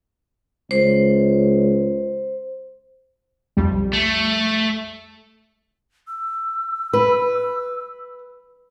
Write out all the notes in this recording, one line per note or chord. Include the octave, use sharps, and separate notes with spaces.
C#2 C5
B1 F2 G3
A3
E6
B4